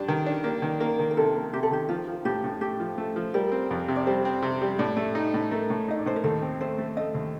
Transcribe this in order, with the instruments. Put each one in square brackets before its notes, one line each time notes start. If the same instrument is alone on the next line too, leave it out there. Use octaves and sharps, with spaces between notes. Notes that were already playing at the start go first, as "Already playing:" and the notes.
Already playing: [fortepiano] G2 G3 D4
D#3
D4
[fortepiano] A#3 [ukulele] G4
[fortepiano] D#3
[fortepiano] A#3 [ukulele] A#4
[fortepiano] D#3
[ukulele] A#4
[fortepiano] C3 [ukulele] A4
[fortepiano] A#3
[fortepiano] C3 [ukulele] G4
[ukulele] A4
[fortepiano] D#3 [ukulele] G4
[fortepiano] F3 [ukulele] F4
[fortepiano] F3
[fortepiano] A2 [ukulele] G4
[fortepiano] A2
[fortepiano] A3 [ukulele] G4
[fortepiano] F3
A3
F3
[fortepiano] G3 [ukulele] A#4
[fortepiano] C4
F2
C3
[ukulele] D5
[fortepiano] G3 [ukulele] C5
[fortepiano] C4
C3
G3
[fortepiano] A2 [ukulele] D5
[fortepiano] A3
D#4
A2
[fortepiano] A3 [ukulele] A#4
[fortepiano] A2
[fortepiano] D#4 [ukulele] D#5
[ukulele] D5
[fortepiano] A2 [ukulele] C5
[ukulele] A#4
[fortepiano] D#2 [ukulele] A4
[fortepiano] C4
[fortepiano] A3 [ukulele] C5
[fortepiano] A3
[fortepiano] A3 [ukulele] D#5
[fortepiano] D#2